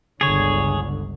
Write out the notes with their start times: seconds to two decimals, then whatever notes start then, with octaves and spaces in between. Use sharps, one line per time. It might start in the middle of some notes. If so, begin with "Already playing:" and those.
0.21 G1 C#2 D3 G#4 C#5